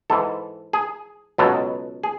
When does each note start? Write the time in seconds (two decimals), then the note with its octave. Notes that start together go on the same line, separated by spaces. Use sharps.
0.10 G#2 E3 A4
0.73 G#4
1.38 C#2 B2 F#3 A4
2.04 G#4